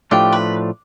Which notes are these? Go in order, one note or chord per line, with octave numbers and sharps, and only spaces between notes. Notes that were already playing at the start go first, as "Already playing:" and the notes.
A2 F3 A3 D4 F4 G4
B4